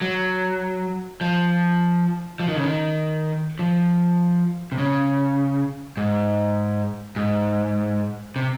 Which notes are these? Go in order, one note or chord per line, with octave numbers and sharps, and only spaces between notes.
F#3
F3
F3
D#3
C#3
D#3
F3
C3
C#3
G#2
G#2
C3